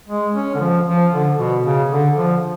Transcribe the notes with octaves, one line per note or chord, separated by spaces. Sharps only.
G#3
C#4
D3
F3
F3
D3
B2
C#3
D3
F3